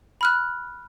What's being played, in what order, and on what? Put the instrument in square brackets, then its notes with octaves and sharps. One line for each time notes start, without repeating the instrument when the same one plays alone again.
[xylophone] B5 F6 F#6